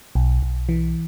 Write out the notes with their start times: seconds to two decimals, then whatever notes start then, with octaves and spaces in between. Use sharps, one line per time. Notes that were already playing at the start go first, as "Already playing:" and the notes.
0.15 B1
0.43 B1
0.69 E3